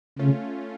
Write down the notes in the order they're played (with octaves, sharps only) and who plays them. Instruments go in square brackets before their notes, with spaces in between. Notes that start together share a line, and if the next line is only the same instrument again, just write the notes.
[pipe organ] C#3 [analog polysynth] A3 C#4 F4